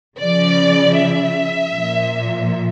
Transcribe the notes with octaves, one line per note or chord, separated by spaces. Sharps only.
C#3 F3 D5
E5
A#2 F3